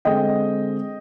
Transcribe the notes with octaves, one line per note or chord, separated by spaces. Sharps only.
D3 G#3 C4 D#5 G5